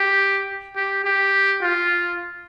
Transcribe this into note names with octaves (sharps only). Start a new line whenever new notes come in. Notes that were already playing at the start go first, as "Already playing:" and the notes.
Already playing: G4
G4
G4
F4